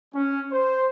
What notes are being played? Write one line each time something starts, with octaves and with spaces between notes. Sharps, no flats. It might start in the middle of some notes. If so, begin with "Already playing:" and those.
C#4
C5